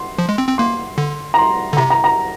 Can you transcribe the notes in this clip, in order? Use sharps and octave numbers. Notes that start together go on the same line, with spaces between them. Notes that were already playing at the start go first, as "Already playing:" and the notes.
Already playing: C6
F3
G#3
C4
C4
A#3 C6
D3
A#5
C6
D3
C3 A#5
A#5
A#5